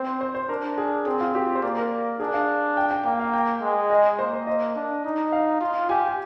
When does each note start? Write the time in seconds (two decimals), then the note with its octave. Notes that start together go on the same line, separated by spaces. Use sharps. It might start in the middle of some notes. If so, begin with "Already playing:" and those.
Already playing: C4 C5
0.21 C5
0.35 C5
0.49 D4 A#4
0.78 G#4
1.06 C4 G#4
1.21 F4
1.35 G4
1.55 C5
1.62 A#3 D5
1.77 A#4
2.20 D4 G#4
2.34 F5
2.77 G5
2.91 G5
3.05 A#3 G5
3.20 F5
3.34 G5
3.62 G#3
3.90 D#5
4.19 A#3 C5
4.33 C5
4.47 D#5
4.75 D4
5.05 D#4
5.32 F5
5.61 F4
5.89 G4 G#5
6.07 G#5